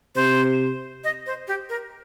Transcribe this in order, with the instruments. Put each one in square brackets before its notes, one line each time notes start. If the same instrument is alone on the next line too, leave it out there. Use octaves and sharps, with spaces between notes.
[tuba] C3 [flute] C5
[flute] D#5
C5
G4
A#4